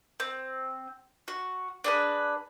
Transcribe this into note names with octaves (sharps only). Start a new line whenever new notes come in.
C4
F#4
D4 G#4 B4